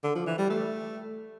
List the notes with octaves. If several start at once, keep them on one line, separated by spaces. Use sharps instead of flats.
D3
F3
E3
G3
A3